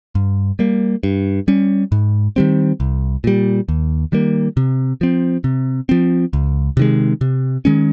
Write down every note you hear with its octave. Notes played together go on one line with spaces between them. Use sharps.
G2
G3 A#3
G2
G3 C#4
G#2
D#3 G3 C4
C2
A#2 G3
D#2
D#3 G3 A#3
C3
F3 C4
C3
F3 C4
C#2
C3 D#3 G#3
C3
D#3 G#3 C#4